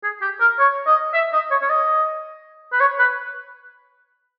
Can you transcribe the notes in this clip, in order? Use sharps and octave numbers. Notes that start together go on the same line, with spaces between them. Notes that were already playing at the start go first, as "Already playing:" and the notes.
G#4
G4
A#4
C#5
D#5
E5
D#5
C#5
C#5
D#5
B4
C#5
B4